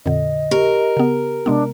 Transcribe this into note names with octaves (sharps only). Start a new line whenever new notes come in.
F2 A#2 D3 D#5
G4 A#4
C#3 B3
C3 G#3 B3 D4